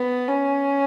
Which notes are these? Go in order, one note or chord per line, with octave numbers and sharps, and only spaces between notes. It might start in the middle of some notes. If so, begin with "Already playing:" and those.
Already playing: B3
C#4